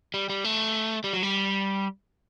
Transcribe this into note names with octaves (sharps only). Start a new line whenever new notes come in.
G3
G3
A3
G3
F#3
G3